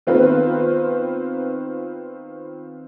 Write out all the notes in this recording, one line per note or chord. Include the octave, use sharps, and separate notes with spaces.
D#3 B3 C4 F4 B4